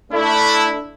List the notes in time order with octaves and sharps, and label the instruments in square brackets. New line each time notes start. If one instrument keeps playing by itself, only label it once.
[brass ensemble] A3 D4 E4